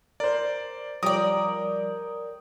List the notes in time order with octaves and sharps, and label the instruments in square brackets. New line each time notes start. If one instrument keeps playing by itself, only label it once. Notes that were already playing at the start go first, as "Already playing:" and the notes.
[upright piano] A#4 C5 [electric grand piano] D5
[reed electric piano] F3 G3 [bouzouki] A#4 D5 [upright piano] C#5 G5 [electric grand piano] D#6